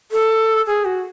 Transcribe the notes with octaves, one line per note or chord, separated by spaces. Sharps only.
A4
G#4
F#4